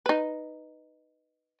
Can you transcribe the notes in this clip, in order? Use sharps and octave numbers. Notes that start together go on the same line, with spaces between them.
D#4 B4